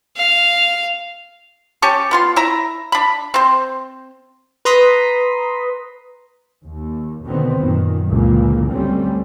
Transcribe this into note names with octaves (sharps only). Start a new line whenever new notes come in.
F5
C#4 G4 A5 C#6
B3 F4 C6
E4 E5 A#5
D4 B5
C4 C5
B4 A#5 C6 D#6 B6
D#2
B2 D3 D#3 B3 C4
F#2 A#2 D#3
C#2 G2 A#2 D3 E3 A#3
D2 G3 A3 C4 C#4